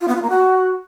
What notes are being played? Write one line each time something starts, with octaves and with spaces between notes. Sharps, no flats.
F4
B3
F4
A#3
F#4